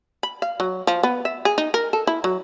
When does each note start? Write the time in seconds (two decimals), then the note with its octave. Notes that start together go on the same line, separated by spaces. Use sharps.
0.23 B5
0.42 F5
0.60 F#3
0.87 F3
1.03 B3
1.25 E5
1.45 G#4
1.58 D#4
1.74 A#4
1.93 A4
2.07 E4
2.24 F#3